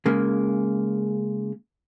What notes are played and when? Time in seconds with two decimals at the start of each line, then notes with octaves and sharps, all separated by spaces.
0.06 C#3 G#3 A#3